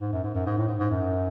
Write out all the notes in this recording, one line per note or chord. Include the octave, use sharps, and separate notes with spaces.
G#2
F#2
G#2
F#2
G#2
A2
G#2
G#2
F#2